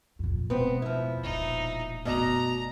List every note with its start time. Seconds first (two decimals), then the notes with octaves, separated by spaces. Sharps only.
0.19 F2 A#2
0.50 E1 B3 C4
0.82 F3 E4
1.23 E1 A#2 D#4
2.05 F#1 B2 A3 D5 D#5 A#5